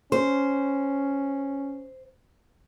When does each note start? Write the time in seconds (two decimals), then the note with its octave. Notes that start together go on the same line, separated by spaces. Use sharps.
0.12 C#4 C5